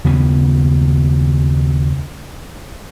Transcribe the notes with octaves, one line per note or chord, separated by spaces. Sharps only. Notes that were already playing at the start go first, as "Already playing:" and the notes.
D#2 C#3 B3 C#4